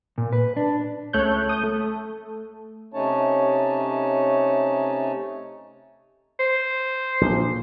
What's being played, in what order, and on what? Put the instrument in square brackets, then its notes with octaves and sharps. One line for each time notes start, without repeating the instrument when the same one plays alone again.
[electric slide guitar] A#2
B4
D4
[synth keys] C#2 A3 C#5 F#6 G6
D#6 G6
A3
[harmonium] C3 A3 C#4 D#4 C#5 A5
[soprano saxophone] C5
[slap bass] A#1